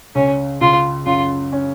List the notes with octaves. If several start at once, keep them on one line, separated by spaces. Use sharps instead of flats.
C#2 C#4
C#2 F4
F#2 F4
C#4